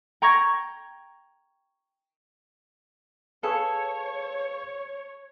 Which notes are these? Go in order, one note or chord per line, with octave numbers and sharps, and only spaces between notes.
G5 A#5 C#6 G#6 A#6
G#4 A4 B4 C#5 F5